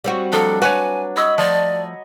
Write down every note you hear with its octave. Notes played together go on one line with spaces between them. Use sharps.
G3 C4 F#4
F3 F#3 A#3 D4 A4
F#4 B4 C#5 G#5
C#5 D#5 B5 E6
F3 A3 D5